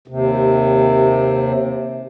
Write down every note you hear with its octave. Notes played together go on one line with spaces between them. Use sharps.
D#2 C3